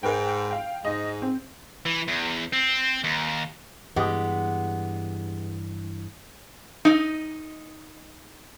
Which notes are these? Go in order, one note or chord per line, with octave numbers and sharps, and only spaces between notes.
G#2 A#4 B4 G5
F5 G5
G#2 D#5
C4
E3
E2
C4
D#2
G2 E3 G#3 B3 G4
D#4 D#5